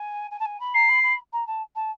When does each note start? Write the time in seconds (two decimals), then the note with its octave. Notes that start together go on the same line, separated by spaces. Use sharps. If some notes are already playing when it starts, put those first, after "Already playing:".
Already playing: G#5
0.31 G#5
0.40 A5
0.45 G#5
0.60 B5
0.74 A#5 C7
0.89 B5
1.03 B5
1.33 A#5
1.47 A5
1.75 A5